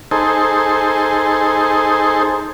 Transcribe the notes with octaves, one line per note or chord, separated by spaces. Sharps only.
D#4 G#4 A4 C5